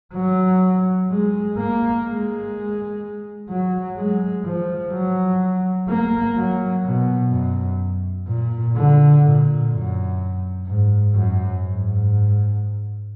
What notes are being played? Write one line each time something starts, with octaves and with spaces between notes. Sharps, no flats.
F#3
G#3
A#3
G#3
F#3
G#3
F3
F#3
A#3
F#3
B2
F#2
A#2
D3
A#2
F#2
G#2
F#2
G#2